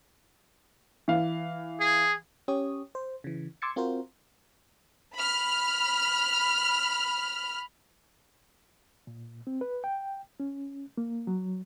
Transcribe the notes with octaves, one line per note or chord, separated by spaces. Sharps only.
E3 F5
G#4
C#4 G4 C#5 D#6
C5
C#3 E3
C6 D6 E6 G#6 A6 C#7
C4 F4 F#4 A#4 C5
B5 F6
A#2
C4
B4
G5
C#4
A#3
F#3